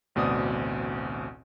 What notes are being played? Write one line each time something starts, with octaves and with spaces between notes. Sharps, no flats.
A1 D2 B2 C4 D5 D#6